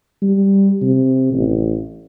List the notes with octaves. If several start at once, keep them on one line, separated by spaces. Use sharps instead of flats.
G3
C3
A1